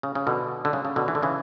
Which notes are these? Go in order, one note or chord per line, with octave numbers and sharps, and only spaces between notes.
C#3
C#3
B2 D3
D3
C#3
C#3
B2 D3
E3
D3
C#3 E3